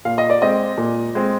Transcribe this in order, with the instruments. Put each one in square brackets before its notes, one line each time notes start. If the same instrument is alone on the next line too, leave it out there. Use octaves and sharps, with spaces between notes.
[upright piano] A#2 F5
D#5
D5
G#3 C4 D#5
A#2
G#3 C4